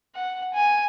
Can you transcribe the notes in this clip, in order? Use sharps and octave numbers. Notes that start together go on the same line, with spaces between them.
F#5
G#5